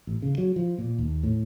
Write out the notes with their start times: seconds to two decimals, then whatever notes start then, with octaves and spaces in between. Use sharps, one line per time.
0.07 A1
0.22 C#3
0.38 F#3
0.56 F3
0.78 A#2
0.98 D#2
1.23 A2